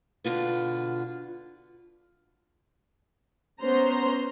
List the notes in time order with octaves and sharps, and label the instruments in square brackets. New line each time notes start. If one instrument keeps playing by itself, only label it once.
[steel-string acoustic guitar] B2 D3 F4 B4
[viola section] B3 C#4 C5 A#5 C6